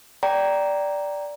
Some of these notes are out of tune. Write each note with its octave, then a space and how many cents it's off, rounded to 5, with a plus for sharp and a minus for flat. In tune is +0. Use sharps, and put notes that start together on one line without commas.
D5 -5 G5 -10 A#5 +0